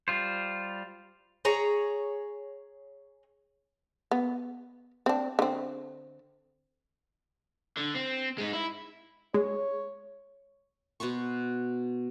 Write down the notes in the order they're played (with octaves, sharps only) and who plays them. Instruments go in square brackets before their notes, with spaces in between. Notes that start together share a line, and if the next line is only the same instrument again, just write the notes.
[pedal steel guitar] G3 F4 C5
[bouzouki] G#4 C#5 A#5
[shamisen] B3
C4 D4
D3 C4
[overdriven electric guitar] D3
C4
G#3 D#4
E4
[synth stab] G#3 [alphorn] C#5
[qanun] B2 B3 C5 C#6